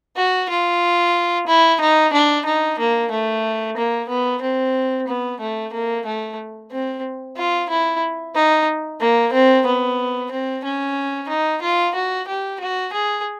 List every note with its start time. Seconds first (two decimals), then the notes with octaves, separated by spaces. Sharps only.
0.17 F#4
0.49 F4
1.47 E4
1.81 D#4
2.13 D4
2.45 D#4
2.79 A#3
3.11 A3
3.77 A#3
4.09 B3
4.42 C4
5.08 B3
5.40 A3
5.73 A#3
6.06 A3
6.72 C4
7.37 F4
7.70 E4
8.35 D#4
9.00 A#3
9.33 C4
9.66 B3
10.31 C4
10.64 C#4
11.29 D#4
11.62 F4
11.95 F#4
12.27 G4
12.60 F#4
12.93 G#4